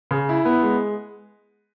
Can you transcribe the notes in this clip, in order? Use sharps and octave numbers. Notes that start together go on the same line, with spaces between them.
C#3
E4
B3
G#3